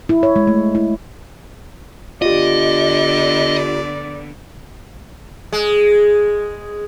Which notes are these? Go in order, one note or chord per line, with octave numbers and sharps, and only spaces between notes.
E4
C#5
G#3
A3
E4
D3 B3 F4 G4 D5 D#5
G#3